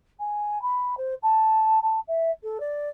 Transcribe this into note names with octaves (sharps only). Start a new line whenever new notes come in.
G#5
B5
C5
A5
A5
E5
A4
D5